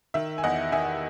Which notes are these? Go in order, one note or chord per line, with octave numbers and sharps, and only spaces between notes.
D#3 E5
G#5
E2 D#5 F#5
D#3 E5 G#5